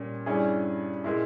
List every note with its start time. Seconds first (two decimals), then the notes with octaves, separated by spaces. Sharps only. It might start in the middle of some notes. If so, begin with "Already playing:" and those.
Already playing: A#2 G3 C#4
0.26 G2 G3 C#4 E4 G#4
1.04 A#2 G#3 E4